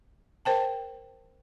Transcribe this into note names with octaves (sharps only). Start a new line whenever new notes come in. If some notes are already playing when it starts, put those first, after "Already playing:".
A#4 C5 G5 A5